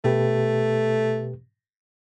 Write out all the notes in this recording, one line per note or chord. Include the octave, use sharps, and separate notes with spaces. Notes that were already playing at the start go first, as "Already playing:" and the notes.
B2 A3 G4 B4